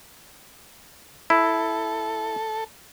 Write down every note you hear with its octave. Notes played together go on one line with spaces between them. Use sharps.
E4 A4